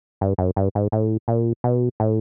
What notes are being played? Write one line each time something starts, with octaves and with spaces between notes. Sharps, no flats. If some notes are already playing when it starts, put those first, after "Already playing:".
G2
F#2
G2
G#2
A2
A#2
B2
A2